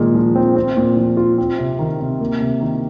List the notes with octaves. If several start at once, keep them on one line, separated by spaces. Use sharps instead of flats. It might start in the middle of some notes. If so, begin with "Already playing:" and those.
Already playing: A#2 D#3 G#3
F3
C4
C4
A#2
F3
F4
C4
C3
D#3
C3
A#3
C3
D#3